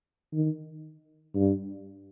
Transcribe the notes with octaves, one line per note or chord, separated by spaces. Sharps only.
D#3
G2